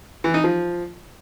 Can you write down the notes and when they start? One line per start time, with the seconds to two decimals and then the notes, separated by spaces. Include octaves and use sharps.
0.24 E3
0.34 D#4
0.44 F3